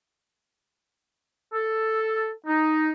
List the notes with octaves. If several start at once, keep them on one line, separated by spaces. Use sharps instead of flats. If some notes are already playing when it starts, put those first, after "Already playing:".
A4
D#4